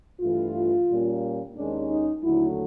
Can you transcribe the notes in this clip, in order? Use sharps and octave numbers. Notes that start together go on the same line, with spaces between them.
G2 E3 A3 F4
A#2 G3 A#3 C#4
D#2 D#3 G#3 C#4 D4
D#4
D#2 D3 F#3 A3 E4